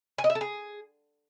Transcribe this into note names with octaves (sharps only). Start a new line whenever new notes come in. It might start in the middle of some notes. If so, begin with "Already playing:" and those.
G#5
D#5
E5
A4
G#4